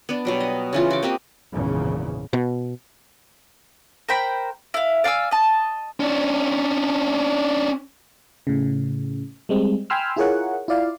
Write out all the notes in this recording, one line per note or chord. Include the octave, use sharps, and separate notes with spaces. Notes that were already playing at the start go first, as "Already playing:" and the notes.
B3 D4
B2 F#3 G3
D#5
C#3 E3 F4
F#4 D6
A#3 C4 G4 D#5
G#1 E2 A#2 C#3
B2
A#4 C5 G5 B5
E4 F5
D5 F5 G#5 E6
D#5 A5
C#4 D4
A2 C#3
G3 G#3 C4
G5 G#5 B5 C6 E6 F6
E4 F4 G#4 A#4 C#5 F#5
E4 F4 D5 F5